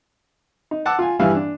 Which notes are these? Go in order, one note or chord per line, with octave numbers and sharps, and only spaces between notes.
D#4
F#5 A5 D6 E6
F4 G#5
G2 E3 G3 E4 F5 G#5
D4